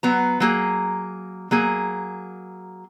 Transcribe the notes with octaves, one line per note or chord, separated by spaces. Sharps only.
F#3 B3 A#5
F#3 A#3 G#4
F#3 A#3 G#4